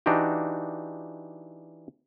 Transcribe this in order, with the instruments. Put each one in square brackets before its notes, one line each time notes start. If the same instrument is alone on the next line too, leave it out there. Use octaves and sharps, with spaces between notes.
[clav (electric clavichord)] E3 D4 D#4 F#4 G4